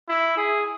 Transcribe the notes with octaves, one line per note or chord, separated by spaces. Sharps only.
E4
G#4